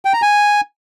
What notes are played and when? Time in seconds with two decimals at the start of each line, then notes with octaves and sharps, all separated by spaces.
0.05 G5
0.13 A#5
0.22 G#5